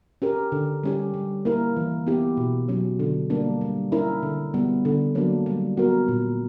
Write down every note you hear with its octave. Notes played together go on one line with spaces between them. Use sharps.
C#4 G4 A#4
D3
G3 C#4 G4
G3
A#3 E4 A#4
E3
B3 E4 G4
B2
F#3 C#4
D3
G3 A#3 D4
G3
C#4 E4 A#4
D3
G3 B3
D3
F#3 A#3 D4
G3
B3 F#4 A#4
A#2